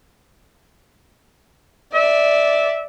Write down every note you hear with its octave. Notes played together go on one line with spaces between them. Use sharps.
D5 E5